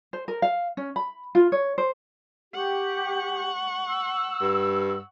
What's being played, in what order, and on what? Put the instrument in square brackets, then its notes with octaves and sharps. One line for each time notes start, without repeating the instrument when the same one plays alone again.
[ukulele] C5
A#4
F5
C#4
B5
F4
C#5
C5
[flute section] G4 [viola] F#5 C#6
[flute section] E6
[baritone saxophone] G2